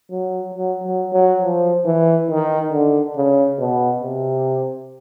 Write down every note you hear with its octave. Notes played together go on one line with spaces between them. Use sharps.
F#3
F#3
F#3
F#3
F3
E3
D#3
D3
C#3
B2
C3